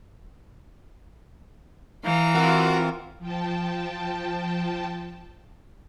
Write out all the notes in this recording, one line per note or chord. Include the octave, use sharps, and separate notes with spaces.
E3 F5 A#5
C4 F4 F#4 A#4
F3 G5 A5